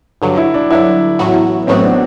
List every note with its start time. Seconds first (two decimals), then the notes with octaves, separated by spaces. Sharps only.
0.22 G2 D3 F#3
0.37 E4
0.54 D4
0.71 G2 D3 F#3 E4
1.19 A1 A2 F#3 B3 F#4
1.67 A1 A2 F#3 B3 C4 F#4
1.84 D4